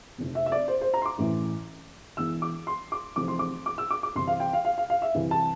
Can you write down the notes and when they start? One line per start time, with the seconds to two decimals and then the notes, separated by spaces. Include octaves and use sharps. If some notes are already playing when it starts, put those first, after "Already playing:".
0.18 F1 F2 C3
0.35 E5
0.46 E5
0.52 D5
0.68 C5
0.81 C5
0.94 A#5
1.02 C6
1.05 D6
1.18 A1 A2 E3
2.17 E1 E2 E3 E6
2.42 D6
2.67 C6
2.92 D6
3.16 F1 F2 C3 E3 D6
3.28 C6
3.39 D6
3.66 D6
3.78 E6
3.91 D6
4.03 D6
4.15 C2 C3 E3 C6
4.28 F5
4.40 G5
4.53 F5
4.65 F5
4.78 F5
4.90 F5
5.02 E5
5.15 C2 C3 E3
5.31 A5